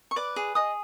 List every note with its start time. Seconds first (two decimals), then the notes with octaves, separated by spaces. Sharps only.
0.11 C#6
0.16 B4 D5 D6
0.36 G#4
0.55 G#4 D#5 D#6